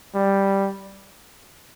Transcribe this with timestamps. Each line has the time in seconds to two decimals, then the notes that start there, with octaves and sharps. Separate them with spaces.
0.15 G3